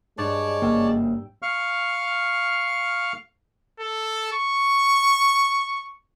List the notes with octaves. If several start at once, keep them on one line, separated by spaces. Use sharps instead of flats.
G2 G#3 C#5 D5 A5
F#1 A#3 G5 E6
F5 C#6 F6
A4
C#6